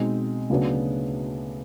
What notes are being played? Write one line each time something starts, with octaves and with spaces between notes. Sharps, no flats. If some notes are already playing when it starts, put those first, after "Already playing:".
Already playing: B2 G#3 C4 D#4
D2 C#3 F#3 B3 D4